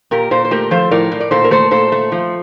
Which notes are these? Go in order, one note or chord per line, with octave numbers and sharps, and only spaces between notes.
A#2 G4 A#4
A#2 A4 C5
C5
A3 G4 A#4
F3 A4 C5
A2 A#4 D5
A2
D5
A#2 A4 C5
A#4
A3 A4 C5
A#2 A4 C5
A3
F3